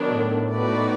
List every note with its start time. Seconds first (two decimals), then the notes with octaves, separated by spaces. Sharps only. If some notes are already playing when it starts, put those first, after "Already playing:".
Already playing: D#3 F#3 B3 D4
0.08 A2
0.52 B3 D#4 F#4 B4 D5